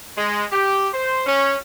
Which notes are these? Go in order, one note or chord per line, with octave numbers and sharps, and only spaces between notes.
G#3
G4
C5
C#4